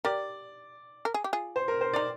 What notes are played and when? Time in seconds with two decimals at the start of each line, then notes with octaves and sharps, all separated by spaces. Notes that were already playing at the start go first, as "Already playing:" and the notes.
0.05 G4 A#4 D5
1.05 A#4
1.14 G#4
1.24 G4
1.33 F4 G#4
1.56 C5
1.68 A#4
1.81 C5
1.93 D#4 D5